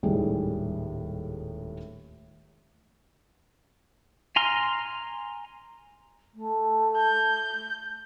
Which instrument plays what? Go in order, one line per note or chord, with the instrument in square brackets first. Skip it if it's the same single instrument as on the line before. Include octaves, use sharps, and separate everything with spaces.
[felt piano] D#1 C#2 A2 D#3 G3 G#4
[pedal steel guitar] G#5 A#5 C6 F6
[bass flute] A3
[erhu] G6